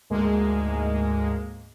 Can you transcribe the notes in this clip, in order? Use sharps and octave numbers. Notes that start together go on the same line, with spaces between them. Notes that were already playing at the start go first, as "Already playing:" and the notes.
D2 G#2 G#3 A#3